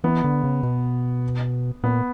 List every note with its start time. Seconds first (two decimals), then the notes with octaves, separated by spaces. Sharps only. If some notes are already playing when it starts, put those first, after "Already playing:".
0.04 E3 B3
0.24 D3
0.44 C#3
0.63 B2
1.84 A#2 B3